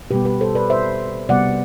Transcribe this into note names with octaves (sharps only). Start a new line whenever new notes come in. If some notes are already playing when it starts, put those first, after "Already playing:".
B2 G3 B3 G4 B4
G4 B4
A4 C5
B4 D5
C5 E5
C3 G3 B3 D5 F#5